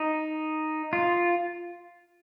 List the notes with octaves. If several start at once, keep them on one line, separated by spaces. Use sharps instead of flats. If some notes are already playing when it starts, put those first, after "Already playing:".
Already playing: D#4
F4